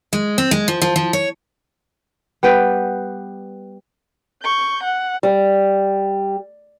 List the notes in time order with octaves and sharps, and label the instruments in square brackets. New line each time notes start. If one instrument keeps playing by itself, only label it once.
[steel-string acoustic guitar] G#3
C4
G#3
F3
F3
F3
C#5
[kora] G3 B3 B4 G5
[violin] C#6 G6
F#5
[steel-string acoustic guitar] G3